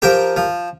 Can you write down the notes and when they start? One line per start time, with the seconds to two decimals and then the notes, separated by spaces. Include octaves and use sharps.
0.02 F3 G4 A#4
0.37 F3